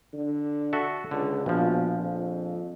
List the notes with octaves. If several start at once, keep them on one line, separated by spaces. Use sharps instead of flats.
D3
F#4 A4 E5
C#2 D3
A#1 B2 F3
F2